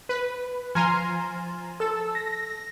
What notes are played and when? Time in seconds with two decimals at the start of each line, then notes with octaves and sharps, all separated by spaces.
0.09 B4
0.75 F3 G#5 A#5 C6
1.80 A4 E6
2.15 A#6